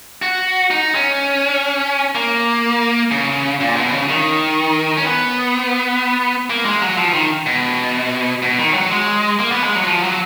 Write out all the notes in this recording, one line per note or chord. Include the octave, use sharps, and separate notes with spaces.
F#4
D#4
C#4
A#3
C#3
A#2
B2
C#3
D#3
C#4
B3
A#3
G#3
F#3
F3
D#3
B2
B2
D#3
F#3
G#3
A#3
B3
G#3
F#3
F3
F#3